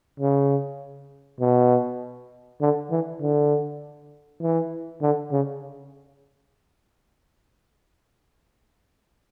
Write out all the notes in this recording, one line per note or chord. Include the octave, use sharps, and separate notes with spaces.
C#3
B2
D3
E3
D3
E3
D3
C#3